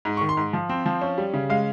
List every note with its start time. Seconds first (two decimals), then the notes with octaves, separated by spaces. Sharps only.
0.05 G#2
0.17 D#3 C#6
0.29 C6
0.37 G#2
0.53 F3
0.69 C4
0.86 F3
1.02 C#4
1.18 G3
1.34 C#3
1.50 G#3 F5